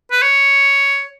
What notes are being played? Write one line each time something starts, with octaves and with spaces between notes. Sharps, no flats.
B4
C#5